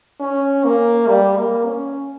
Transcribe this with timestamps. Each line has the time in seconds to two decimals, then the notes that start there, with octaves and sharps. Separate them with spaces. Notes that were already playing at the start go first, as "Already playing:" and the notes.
0.20 C#4
0.64 A#3
1.07 G3
1.37 A#3
1.66 C#4